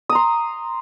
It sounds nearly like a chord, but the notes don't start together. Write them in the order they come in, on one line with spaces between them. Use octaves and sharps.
D#6 A#5 C6